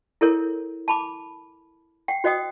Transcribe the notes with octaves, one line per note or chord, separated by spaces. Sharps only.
E4 A4 A#4 C#5
A5 B5 D6
F#5 G5
F#4 C5 D#5 F#5 G5 D#6